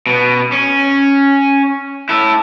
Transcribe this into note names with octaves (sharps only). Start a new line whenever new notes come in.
B2
C#4
E4 A4